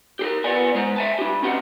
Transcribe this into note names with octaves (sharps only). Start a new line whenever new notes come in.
G4 G#4 A#4
B3 D5 G#5
G#3 C5
E5 G#5 A5
D4 G4
C4 C#4 G4 F#5